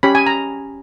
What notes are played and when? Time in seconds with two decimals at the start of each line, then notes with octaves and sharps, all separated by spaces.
0.03 C#4 G4 C#5 B5
0.15 G#5
0.27 A#5